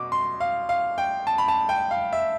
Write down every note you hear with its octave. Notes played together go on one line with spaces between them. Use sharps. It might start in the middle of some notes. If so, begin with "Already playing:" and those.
Already playing: B2 D6
C6
F5
F5
G5
A5
B5
A5
G5
F5
E5